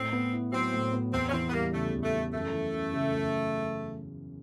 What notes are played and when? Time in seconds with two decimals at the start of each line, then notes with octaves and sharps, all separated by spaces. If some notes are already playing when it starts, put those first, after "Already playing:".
Already playing: A2 C4
0.13 B3
0.32 E4
0.52 F#3 C4
0.73 A2
0.93 B3
1.12 E2 C4
1.29 C#4
1.33 E3 C4
1.49 B3
1.52 G3 A#3
1.73 C#3 A3
1.93 E2
2.03 A3
2.14 E3
2.33 F#2 A3
2.53 E3
2.74 F#2
2.93 C#3
3.14 F#2